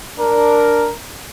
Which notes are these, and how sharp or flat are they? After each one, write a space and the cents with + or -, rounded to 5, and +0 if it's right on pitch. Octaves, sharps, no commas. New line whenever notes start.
D4 +0 A#4 +0